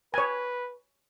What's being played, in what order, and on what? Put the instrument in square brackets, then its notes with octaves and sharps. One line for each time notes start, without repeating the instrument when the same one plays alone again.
[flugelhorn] B4 [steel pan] C#5 G#5